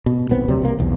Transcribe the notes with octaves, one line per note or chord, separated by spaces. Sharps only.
B2
D#1 B1 B3 C4
D2 C3 F#3 G3
C2 C3 A#3
B1 E2